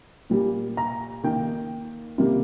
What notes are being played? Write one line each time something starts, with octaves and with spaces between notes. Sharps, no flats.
A#2 G3 A#3
A#5
D#3 A#3 G5
C3 D#3 G3 A#3